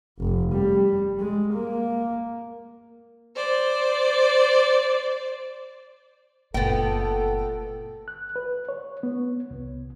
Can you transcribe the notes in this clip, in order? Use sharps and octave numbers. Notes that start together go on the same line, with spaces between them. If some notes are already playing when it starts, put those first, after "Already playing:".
F1
G3
G#3
A#3
C5 D5
F#1 A#2 A3 B3 D4 A4 G5
F#6
B4
C#5
B3
C2